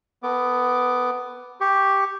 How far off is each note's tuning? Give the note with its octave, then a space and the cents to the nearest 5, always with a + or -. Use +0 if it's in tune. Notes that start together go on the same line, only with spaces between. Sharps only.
B3 +10 A#4 -45 D6 +0
G4 +0 C#6 +0